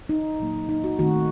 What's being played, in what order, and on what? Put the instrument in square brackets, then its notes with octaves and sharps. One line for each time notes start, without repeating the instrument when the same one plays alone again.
[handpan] D#4
A#2 F#3 A#3
D#4
F#4
D#3 A3 C4 F#4